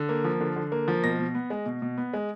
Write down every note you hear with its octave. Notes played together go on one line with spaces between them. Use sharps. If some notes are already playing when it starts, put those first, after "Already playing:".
Already playing: D3
A#3
F3
D3
D3
A#3
F3
B2 A#6
B2
B3
G#3
B2
B2
B3
G#3